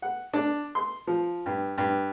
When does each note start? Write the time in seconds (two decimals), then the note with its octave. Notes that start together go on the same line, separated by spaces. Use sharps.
0.02 F#5
0.34 D4
0.75 C6
1.07 F3
1.46 G2
1.78 G2